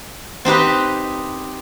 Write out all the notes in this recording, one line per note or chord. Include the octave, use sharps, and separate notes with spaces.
C4 D#4 G4 B4